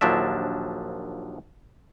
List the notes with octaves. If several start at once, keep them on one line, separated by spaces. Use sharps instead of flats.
A#1 D#2 F3 F#3 D4 E5